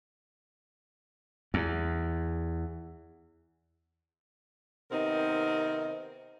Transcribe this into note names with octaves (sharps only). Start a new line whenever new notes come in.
E2
C3 D#3 B3 C4 D#4 A#4